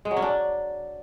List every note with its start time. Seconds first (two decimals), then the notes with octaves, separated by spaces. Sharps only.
0.05 G#3
0.11 F#3
0.17 C#4
0.22 D4